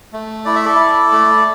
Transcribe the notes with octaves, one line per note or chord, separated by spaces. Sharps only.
A3
E4 D5
E5
A4 D5
E4
A3